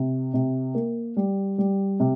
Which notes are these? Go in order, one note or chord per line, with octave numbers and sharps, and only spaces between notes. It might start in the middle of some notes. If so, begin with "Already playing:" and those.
Already playing: C3
C3
A#3
G3
G3
C3